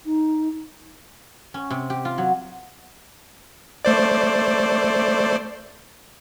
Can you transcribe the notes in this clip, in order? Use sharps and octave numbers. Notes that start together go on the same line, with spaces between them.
D#4
C#4
C3
G4
F4
F#3
A3 C5 D5